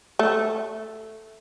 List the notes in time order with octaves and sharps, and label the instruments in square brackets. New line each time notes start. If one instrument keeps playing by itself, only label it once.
[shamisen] A3